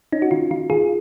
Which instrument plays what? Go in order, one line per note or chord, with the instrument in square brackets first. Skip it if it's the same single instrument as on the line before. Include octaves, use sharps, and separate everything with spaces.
[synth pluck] C#4 D#4
F#4
D#3 F4
D#3 F4
D#3 F4 G#4